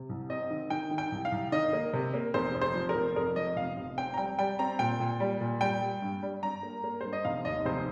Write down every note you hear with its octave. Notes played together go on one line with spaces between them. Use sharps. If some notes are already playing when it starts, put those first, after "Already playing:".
Already playing: C3
C2
C4 D#5
D#3
D#3 G5
D#3
G5
C2
F5
C2
D#3 D#5
A#3
C3
A#3
F1 C5
F2
C5
F3
A#4
F1
F2 A#4
F3 D#5
F1 F5
F1
C4 G5
A#5
G3 G5
G3 G5
C4 A#5
A#2 G5
A#2
G3
A#2
G3 G5
G3
G2
G3
G2 A#5
A#3
A#3
G2 C5
D#5
F1 F5
D#2 D#5
F1 C5